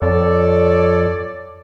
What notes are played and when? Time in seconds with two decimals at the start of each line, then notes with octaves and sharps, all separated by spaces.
0.02 F2 A4 C#5 D5